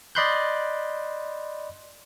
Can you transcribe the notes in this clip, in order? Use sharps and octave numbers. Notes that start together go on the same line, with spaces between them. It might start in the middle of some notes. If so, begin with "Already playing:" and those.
D5 D#5 B5 C6 F#6 G6